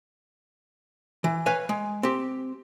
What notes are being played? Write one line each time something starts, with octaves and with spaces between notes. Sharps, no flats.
E3
B4 C#5 F5 G#5
G#3
C4 G4